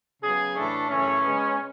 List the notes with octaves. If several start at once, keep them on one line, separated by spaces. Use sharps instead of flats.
C#3 F#3 B3 G#4
A2 E3 A3 D4
F#2 C#3 E3 A3 C#4
C#3 G#3 B3